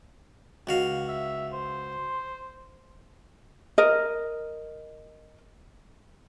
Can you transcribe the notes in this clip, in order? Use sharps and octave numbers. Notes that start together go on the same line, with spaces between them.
C#2 F#4 F5
E5
C5
A#4 D#5